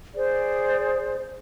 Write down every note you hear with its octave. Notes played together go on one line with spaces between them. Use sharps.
G#4 C5 D5